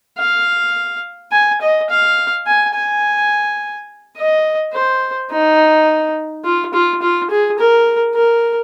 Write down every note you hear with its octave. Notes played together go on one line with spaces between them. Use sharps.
F5
G#5
D#5
F5
G#5
G#5
D#5
C5
D#4
F4
F4
F4
G#4
A#4
A#4